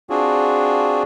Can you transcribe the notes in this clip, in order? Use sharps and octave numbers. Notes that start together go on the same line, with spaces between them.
C4 D4 F4 F#4 G#4